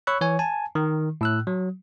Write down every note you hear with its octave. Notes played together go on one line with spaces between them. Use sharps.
C#5 B5 C#6 E6 F#6
E3 C#5 G#5
G#5 A5
D#3
A2 E6 F#6
F#3